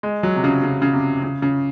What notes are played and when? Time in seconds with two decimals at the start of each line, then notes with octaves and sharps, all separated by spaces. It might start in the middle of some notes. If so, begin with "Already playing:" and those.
0.03 G#3
0.23 F#3
0.36 C3
0.44 C#3
0.63 C#3
0.82 C#3
0.93 C3
1.23 C#3
1.42 C#3